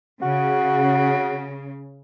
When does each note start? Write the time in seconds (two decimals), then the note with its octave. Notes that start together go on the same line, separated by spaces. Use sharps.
0.22 C#3 F#4